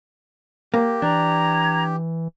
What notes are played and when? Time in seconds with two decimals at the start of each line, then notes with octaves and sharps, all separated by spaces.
0.74 A#3 G4
1.02 E3 D4 A#5 G#6